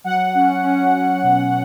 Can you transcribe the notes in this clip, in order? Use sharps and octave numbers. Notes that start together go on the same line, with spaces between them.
F#3 F#5
C#4
C#4
C#4
B2